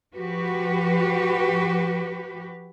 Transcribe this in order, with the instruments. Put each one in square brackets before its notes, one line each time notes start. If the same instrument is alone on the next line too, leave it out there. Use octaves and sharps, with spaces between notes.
[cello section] F3 F#4 G4 B4